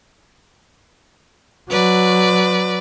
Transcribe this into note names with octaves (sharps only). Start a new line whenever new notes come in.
F#3 B4 D5